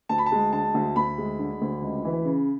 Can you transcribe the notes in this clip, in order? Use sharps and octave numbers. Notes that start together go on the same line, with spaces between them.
D2 A5
B5
A5
G#3
D3 A5
D2
D2 B5
G#3
D3
D2
C#2
E3
C#3